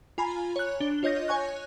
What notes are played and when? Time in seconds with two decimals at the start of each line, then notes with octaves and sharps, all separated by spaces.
0.18 F4 G#5 A#5 B5
0.56 C#5 F#6
0.80 D4 G7
1.03 F4 C#5 D#5 G6 A#6
1.28 C#5 G#5 C#6 F#6